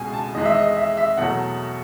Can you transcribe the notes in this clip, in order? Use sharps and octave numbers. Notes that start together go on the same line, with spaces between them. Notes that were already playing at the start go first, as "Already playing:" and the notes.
Already playing: C#2 B2 G#3 G#5
A5
E2 D#3 G#3 D#5
E5
D#5
E5
E5
E2 B2 F#3 A3 F#5